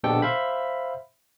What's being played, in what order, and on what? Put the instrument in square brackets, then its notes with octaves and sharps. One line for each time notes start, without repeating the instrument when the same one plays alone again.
[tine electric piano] A#1 B2 D3 G4 A4 G5
C5 E5 F5 B5